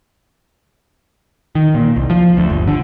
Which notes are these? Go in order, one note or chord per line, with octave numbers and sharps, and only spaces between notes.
D#3
A#2
C2
F3
D2
G1
D3